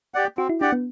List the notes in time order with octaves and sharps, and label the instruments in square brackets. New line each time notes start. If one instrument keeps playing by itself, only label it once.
[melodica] G4 D5 F#5
[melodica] C4 [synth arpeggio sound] F#4
[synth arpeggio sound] E4
[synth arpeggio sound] D4 [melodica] G4 D5 F#5
[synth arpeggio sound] B3